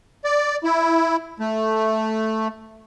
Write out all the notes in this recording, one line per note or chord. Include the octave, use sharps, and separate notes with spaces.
D5
E4
A3